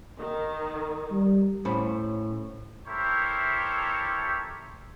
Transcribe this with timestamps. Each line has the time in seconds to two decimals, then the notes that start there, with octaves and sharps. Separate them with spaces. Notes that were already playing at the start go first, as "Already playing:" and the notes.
0.19 D#3
1.11 G3
1.65 A2 C#4 C5 B5
2.87 E4 G4 A4 A#4 C5 C#5